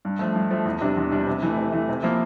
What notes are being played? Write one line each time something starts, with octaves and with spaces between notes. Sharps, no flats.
G2
F3 A3
G2
F3 A3
E2
C3 G3 D4
E2
C3 G3 D4
C3
E3 A3
C3
E3 A3
C3
F3 A#3 E4